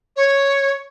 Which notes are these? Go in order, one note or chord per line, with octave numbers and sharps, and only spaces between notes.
C#5